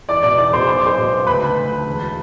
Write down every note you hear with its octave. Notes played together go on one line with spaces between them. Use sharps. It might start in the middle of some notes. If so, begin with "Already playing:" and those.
E2 D5 D6
B2 D5 D6
E2 D5 D6
B2 C5 C6
B1 C6
D6
B1 C5 C6
B2
B1
D2 B4 B5
D2
D2
D2
E1